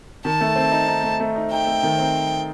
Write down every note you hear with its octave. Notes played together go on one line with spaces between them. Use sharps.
D#3 A5
A3
C4
D#4
D#4
A3
A3
D#4
D#4 G5
A3
D#3
C4